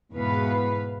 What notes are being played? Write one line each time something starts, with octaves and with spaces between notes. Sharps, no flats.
E2 G#2 B2 B3 B4 F5